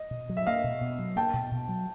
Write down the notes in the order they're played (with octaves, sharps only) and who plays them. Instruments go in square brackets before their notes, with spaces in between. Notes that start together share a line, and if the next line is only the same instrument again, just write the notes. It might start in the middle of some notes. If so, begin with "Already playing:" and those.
Already playing: [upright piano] D#5
[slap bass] B2
F#3
[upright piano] E5
[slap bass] A#3 [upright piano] D#5 F5
[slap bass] B2
B2
F#3
[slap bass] A#3 [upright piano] G5 A5
[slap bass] B2
B2
F#3